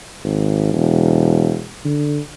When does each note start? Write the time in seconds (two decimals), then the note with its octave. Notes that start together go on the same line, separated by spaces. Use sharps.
0.24 G#1
0.73 E1
1.85 D3